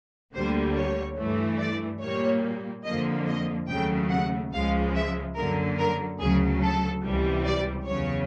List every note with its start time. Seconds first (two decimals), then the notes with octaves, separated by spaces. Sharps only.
0.34 D2 D3 G3 A#3 C5
0.76 C#5
1.18 G2 E3 A3
1.60 D5
2.02 A#2 G3 A#3 C#5
2.85 F2 D3 F3 A#3 D#5
3.27 D#5
3.69 D#2 C#3 F#3 A3 G5
4.10 F#5
4.53 C#2 C#3 F3 G#3 F5
4.95 E5
5.36 F#2 D3 F#3 A#3 A#4
5.78 A#4
6.20 D2 C#3 F#3 G#4
6.61 A4
7.04 C#2 C3 E3 G3
7.45 D5
7.87 E2 C#3 F#3 C#5